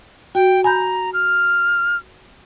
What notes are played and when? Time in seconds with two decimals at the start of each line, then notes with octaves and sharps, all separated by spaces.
0.35 F#4 G5
0.64 G#5 A#5 B5 G6
1.14 F6